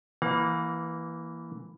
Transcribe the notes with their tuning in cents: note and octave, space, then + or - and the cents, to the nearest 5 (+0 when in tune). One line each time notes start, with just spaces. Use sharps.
E3 +0 A#3 -5 F5 +40